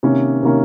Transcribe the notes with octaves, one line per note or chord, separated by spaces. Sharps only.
C3 D#3 A#3 C#4
C3 D#3 A#3 C#4